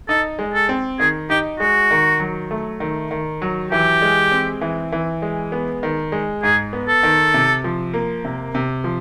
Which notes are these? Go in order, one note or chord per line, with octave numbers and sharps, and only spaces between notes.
D#4 A4
G#3
A4
C4
D#3 G#4
D#4 G4
G#3 F#4
D#3
F#3
A3
D#3
D#3
F#3
E3 G4
G#3
C4
E3
E3
G#3
B3
D#3
G#3
G#2 G#4
B3
A4
D#3
C3
F3
A#3
C3
C3
F3